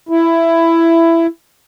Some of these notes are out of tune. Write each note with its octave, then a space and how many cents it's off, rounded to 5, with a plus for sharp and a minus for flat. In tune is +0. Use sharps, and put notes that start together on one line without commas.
E4 +10